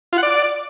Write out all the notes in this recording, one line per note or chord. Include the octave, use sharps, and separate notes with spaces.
F4
F#5
D5